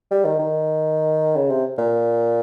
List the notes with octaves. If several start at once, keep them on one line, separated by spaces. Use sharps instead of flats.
G3
D#3
D#3
C#3
C3
A#2